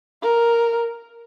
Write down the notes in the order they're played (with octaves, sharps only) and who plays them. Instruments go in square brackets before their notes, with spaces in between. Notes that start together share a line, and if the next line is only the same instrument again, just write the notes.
[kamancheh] A#4